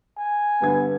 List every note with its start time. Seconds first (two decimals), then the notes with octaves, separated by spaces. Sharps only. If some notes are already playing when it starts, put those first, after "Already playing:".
0.18 G#5
0.62 G2 D3 B3 G#6